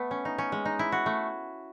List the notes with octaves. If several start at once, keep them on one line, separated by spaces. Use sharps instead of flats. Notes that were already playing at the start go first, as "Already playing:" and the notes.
Already playing: A3 B3
C#4
D#4
C#4
G#3
D#4
E4
F#4
A3